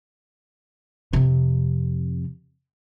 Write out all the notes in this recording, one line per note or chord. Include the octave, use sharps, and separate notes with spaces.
F2 C3